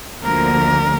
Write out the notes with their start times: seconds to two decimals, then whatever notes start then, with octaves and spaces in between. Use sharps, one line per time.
0.23 D2 D3 F3 A#3 A#4